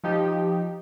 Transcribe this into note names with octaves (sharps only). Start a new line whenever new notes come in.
F3 D#4 G4